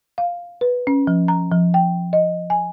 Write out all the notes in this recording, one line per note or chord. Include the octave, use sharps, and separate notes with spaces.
F5
B4
C#4
F3
A#5
F3
G5
D#5
G#5